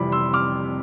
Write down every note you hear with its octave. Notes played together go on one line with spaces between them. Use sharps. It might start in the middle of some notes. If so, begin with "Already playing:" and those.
Already playing: F1 F2 C3 E3 G3 B5 D6
C6 E6
D6 F6